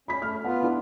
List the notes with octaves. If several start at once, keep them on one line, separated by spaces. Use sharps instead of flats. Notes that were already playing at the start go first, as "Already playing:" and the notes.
C#4 B5 B6
A3 F6
B3 F4 F#5
D4 E4